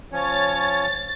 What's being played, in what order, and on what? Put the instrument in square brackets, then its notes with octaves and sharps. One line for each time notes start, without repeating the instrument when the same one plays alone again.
[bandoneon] F3 C#4 [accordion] C#5 [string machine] A6